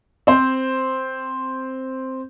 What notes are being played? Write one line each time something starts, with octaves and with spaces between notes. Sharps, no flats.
C4 C5